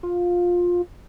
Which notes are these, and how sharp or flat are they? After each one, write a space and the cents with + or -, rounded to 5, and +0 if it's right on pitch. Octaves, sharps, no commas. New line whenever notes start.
F4 +15